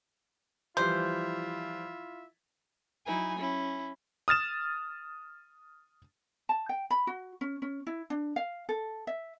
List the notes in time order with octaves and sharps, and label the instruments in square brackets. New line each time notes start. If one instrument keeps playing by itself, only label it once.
[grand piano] E3 F3 G3 [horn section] E4 F4 E5 [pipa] C5
[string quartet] F#3 D#4 E4 G#5
C#4 E4
[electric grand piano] D#6 F6 A6 E7
[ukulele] A5
G5
B5
F#4
C#4
C#4
E4
D4
F5
A4
E5